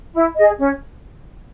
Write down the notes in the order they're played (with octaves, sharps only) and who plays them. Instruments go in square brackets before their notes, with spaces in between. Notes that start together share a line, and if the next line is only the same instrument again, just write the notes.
[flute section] E4
G#4 D#5
C#4